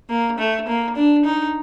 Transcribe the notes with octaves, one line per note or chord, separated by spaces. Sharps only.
A#3
A3
A#3
D4
D#4